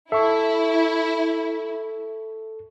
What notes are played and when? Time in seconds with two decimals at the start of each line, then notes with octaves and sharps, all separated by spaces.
0.12 E4 A4 E5 C#6